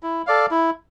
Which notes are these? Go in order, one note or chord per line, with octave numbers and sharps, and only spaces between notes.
E4
A4 D5 F5
E4